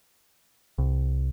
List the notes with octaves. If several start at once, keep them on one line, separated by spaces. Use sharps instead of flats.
C2